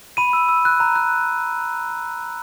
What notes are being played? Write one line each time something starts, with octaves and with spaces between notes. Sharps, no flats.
B5 D#7
E6
E6
F#6
A#5
F#6